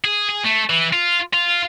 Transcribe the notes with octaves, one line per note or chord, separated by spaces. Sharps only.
G#4
G#4
A3
E3
F4
F4